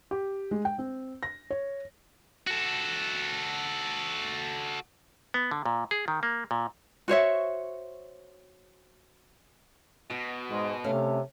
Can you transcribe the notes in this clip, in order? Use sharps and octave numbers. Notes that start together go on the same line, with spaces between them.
G4
G#3
G5
C4
A#6
C#5
F#4 A4
B3
D3
A#2
G#4
D#3
A#3
A#2
F#4 C5 C#5 E5
B2 F#4
G#2 G#3
C3 A3 C#4 F5